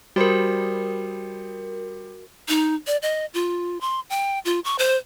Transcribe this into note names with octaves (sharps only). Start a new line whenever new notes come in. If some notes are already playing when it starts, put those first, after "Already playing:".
G3 F#4 A#4 C5
D#4
D5
D#5
F4
C6
G5
F4
C#6
C5